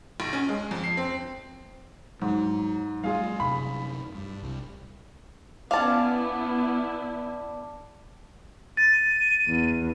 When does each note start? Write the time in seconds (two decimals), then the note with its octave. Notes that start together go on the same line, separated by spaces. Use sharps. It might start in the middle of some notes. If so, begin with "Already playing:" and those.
0.20 B1
0.33 C#4
0.49 G#3
0.71 F2
0.84 C7
0.97 C4
2.22 G#2 F#3
3.04 G3 A3 F4 G#4 F5
3.40 F#2 C3 B5
4.15 G2
4.42 C2
5.71 B3 C#4 D4 E4 F5 A5
8.77 A6 D#7
9.48 E2